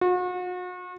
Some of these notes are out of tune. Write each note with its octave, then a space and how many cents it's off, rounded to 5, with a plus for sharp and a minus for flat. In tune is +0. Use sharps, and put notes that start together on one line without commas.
F#4 -40